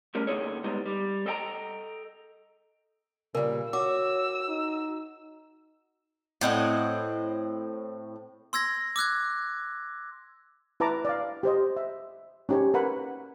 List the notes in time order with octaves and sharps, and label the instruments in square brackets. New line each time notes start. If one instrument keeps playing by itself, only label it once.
[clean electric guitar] G3 A3 C#4 A#4
D2 A#3 D#4 G#4 A4 C#5
G3 G#3 B3 D#4
G3
A4 D#5 G5 A5 A#5
[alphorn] A#2 [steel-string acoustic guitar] C#3 G3 [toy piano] A#4
[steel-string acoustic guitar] F#4 [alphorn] C#5 [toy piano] D6 [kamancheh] E6
[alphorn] D#4
[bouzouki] A2 C4 D#5 F#5
[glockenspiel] C6 E6 G#6 A#6
D6 E6 F#6 G#6
[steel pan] E4 B4 A5 A#5 D6
D5 F5
G4 C5 D#5
E5
C#4 D#4 G4 C5 C#5
A#4 B4 F#5 B5